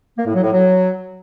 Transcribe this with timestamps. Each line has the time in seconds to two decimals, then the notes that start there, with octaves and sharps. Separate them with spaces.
0.17 A#3
0.26 A2
0.34 F#3
0.43 A2
0.52 F#3